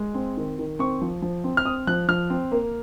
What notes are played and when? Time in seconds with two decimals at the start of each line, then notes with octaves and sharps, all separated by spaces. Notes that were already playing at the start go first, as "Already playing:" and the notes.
Already playing: G#3
0.15 C4
0.37 D#3
0.59 D#3
0.79 C4 C#6
1.02 F3
1.22 F3
1.44 C4
1.57 F6
1.66 C4 D#6
1.87 F3 F#6
2.08 F3 F6
2.30 C4
2.52 A#3